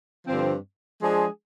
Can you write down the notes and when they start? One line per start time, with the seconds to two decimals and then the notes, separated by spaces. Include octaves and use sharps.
0.27 G2 D3 F3 C4
1.00 F3 G#3 D4 G#4